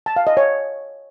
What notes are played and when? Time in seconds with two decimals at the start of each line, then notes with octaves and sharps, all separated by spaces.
0.06 A5
0.16 F5
0.27 D#5
0.37 C#5